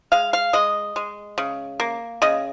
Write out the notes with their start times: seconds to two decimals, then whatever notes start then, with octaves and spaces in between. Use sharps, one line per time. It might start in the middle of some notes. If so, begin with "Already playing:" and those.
0.12 G#3 F5
0.33 F5
0.53 G#3 D#5
0.96 G#3
1.38 C#3
1.80 A#3
2.22 C#3 D#5